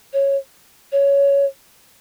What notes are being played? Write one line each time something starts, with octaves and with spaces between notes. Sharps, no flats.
C#5
C#5